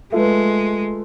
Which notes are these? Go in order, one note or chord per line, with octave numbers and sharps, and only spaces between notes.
G#3 A3 F4 B4